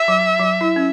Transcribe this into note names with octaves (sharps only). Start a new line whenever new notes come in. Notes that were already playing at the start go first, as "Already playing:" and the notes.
Already playing: E5
F#3
F#3
E4
C#4